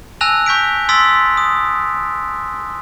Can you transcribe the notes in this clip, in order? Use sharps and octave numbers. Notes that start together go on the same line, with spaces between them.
G#5 A5 E6 F#6 A#6 F7
C#6 G6 B6 D7
C6 D#6 E6 A6 B6 D7
D#6